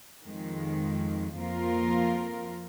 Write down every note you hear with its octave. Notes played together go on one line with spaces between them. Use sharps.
F2 D#3 G#3
F2 F3 A#3 F4 A#4